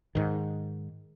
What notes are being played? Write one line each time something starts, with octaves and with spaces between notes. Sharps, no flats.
G#2 D#3